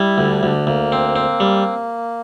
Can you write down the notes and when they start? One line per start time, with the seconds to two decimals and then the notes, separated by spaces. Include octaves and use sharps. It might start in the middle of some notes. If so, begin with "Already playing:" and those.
Already playing: G3 E4
0.18 D2
0.30 D4
0.38 E4
0.43 D2 D4
0.67 D2 A#3
0.92 C4
1.16 C4
1.40 G3